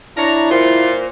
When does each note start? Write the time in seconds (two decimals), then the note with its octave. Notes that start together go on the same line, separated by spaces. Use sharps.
0.17 D4 E4 C#5 A#5
0.51 A#2 F4 C5